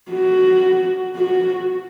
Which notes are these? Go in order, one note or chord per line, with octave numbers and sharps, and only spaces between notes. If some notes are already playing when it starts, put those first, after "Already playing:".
F#4
F#4